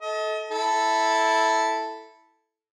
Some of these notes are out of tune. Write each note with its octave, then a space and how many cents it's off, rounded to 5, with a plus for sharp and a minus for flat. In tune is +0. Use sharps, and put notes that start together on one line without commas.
A4 -20 D#5 +35
E4 -5 A4 +0